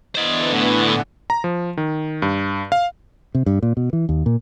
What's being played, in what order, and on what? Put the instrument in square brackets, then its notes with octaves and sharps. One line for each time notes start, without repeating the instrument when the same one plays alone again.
[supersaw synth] D3 E3 B3 [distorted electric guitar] C5 D#5
[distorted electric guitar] A2
[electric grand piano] A#5
F3
D#3
G2
F5
[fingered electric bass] C3
G2
A#2
B2
E3
D#2
A#2